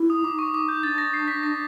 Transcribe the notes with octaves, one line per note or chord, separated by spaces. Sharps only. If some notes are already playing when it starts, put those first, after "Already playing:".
Already playing: E4
D#6
D#4 D6
C#6
D6
G6
D4 A6
A#6
C7
B6
A#6